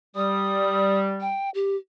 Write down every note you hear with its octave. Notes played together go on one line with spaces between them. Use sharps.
G3 D#6
G5
G4